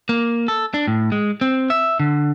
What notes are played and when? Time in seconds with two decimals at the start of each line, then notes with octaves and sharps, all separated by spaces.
0.09 A#3
0.48 A4
0.74 D4
0.88 A2
1.12 G#3
1.41 C4
1.70 E5
2.00 D3